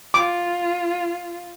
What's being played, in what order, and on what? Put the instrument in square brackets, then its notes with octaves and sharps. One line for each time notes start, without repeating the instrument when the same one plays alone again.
[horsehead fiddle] F4 [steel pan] D6